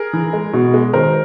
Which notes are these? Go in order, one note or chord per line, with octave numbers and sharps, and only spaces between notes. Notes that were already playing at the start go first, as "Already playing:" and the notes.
Already playing: G#4 A#4
E3
G#3
B2
G#3
D#3 A#4 C5